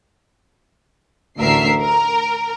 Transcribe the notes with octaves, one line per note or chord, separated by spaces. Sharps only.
A1 D2 A#4 E5 C7
A#4